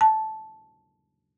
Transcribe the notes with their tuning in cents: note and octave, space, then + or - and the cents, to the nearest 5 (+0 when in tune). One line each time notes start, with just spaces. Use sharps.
A5 -10